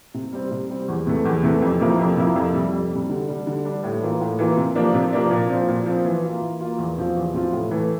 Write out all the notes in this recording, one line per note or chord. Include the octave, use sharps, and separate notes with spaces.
C3
G3 C4
C3
G3 C4
E2
C3 E3 A3
E2
C3 E3 A3
F2
C3 F3 A#3 E4
F2
C3 F3 A#3 E4
F2
C3 G3
F2
C3 G3
D3
G3 D4
D3
G3 D4
A2
E3 A#3 F4
A2
E3 A#3 F4
C3
F3 A#3 D4
C3
F3 A#3 D4
A#2
F3 C4
A#2
F3 C4
E3
A#3 F4
E3
A#3 F4
E2
C3 F3 C4 F4
E2
C3 F3 C4 F4
A2
E3 A3